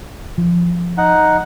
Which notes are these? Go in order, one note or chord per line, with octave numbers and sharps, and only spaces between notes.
F3
D#4 F#5